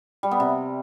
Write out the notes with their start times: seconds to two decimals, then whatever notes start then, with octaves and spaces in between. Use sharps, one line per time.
0.23 G3
0.31 B3
0.40 C3